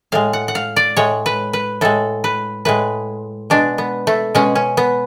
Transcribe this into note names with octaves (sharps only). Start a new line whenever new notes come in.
A2 G#3 F5
F#5
F#5
F5
D5
A2 G#3 C#5
B4
B4
A2 G#3 A4
B4
A2 G#3 B4
B2 G#3 D4
B3
A3
B2 G#3 C#4
C#4
B3